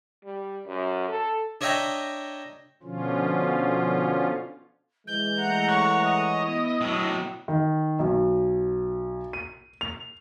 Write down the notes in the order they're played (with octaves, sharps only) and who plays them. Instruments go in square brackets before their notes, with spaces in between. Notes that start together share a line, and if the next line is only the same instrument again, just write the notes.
[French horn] G3
F#2
A4
[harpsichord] D4 C#5 D#5 E5 G5 A#5
[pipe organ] B2 D3 F3 C#4 F4
[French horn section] E3 G#3 [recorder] G6
[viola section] A3 F#5 A#5
[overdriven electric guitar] C#5 [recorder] C#6
[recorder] D#5
[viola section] B3 E4
[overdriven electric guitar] A2 F#3
[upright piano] D#3
B1
D#7
F7